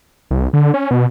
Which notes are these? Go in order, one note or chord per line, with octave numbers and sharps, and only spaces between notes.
C2
D3
C#4
B2